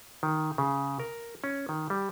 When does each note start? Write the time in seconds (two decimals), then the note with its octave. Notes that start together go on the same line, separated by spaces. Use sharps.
0.23 D#3
0.58 C#3
1.00 A#4
1.44 C#4
1.69 D#3
1.90 G3